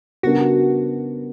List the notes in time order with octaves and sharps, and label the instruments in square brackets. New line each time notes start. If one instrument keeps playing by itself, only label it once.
[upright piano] C#3 G3 B3 D4 A#4 [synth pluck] F#4